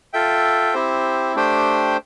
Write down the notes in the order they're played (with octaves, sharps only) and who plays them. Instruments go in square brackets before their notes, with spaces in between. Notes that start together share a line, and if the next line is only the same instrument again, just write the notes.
[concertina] F4 A4 E5 G5
C4 E4 G4 C5
A3 D4 G4 C5 G5